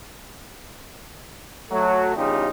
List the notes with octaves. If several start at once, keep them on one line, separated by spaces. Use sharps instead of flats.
F#3 A3
E2 G2 C#3 D#4 F4 G4